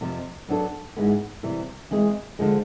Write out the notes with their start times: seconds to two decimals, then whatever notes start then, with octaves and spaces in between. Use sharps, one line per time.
0.01 F2 C3 F3
0.49 F#3 B3 D4 F4 A4
0.97 G#2 E3 G#3 B3
1.43 C3 E3 G3
1.91 E3 G#3 C4 E4 G#4
2.39 D3 F3 G#3